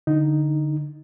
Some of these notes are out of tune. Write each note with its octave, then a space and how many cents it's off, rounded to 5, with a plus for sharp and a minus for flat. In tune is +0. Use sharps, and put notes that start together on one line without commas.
D3 +0 D#4 +0